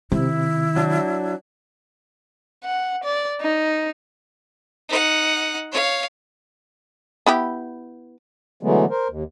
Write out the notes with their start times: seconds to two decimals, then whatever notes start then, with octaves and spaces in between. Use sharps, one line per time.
0.12 C3 D#3 E4
0.76 F#3 D4
2.64 F#5
3.04 D5
3.41 D#4
4.89 D#4 F#5
5.72 C#5 F5
7.26 B3 E4 G4
8.63 D3 E3 F#3 G#3 A3 B3
8.90 A#4 C5
9.08 D#2